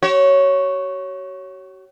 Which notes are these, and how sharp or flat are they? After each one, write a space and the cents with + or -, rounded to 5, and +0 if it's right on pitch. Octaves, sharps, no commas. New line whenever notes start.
F#4 +45 C#5 +0